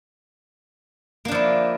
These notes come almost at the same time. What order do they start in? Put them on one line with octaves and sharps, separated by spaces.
A#3 D4 F3 E4